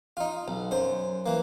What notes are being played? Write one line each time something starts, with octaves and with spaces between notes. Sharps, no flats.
D#4 F4
B1
F#2 C5
E3 A#3